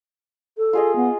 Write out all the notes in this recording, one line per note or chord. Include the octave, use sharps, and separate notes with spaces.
A4
F4 G#4 D#5
B3